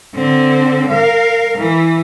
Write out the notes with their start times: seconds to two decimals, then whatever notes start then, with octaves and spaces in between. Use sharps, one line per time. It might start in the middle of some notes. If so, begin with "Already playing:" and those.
0.15 D3 C4
0.90 A#4 F5
1.58 E3